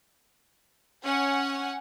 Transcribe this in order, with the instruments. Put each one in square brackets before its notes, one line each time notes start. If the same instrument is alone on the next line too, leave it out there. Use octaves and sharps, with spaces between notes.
[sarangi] C#4 [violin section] C#5 F#5 G#5